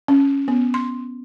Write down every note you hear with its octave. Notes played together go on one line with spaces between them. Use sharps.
C#4
B3
C6